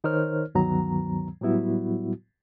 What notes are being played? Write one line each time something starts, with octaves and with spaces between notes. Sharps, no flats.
D#3 D#4 A#4 C5 C#5 F6
D2 G2 D#3 F#3 B3 A#5
A2 F#3 G3 B3 E4 F#4